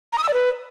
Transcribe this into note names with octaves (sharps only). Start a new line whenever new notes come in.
A#5
D#6
E6
D5
B4